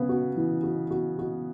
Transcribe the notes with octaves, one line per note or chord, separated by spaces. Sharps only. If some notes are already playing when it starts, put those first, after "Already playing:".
Already playing: C#3 B3
F#4
E3
F#4
F#4
F#4